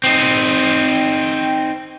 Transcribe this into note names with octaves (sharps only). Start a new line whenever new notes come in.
C4 D#4